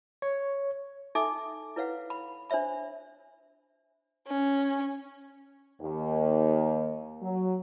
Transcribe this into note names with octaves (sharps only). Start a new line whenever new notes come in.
C#5
D#4 A4 E5 G#5 D6
E4 B4 C#5 F5 F#5
B5
D4 C5 C#5 E5 B5
C#4
D#2
F#3